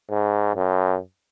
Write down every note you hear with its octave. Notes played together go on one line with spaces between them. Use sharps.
G#2
F#2